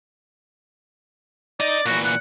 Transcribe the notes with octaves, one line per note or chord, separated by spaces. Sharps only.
D#4 D5 D#5
A#2 E3 F#4
F#5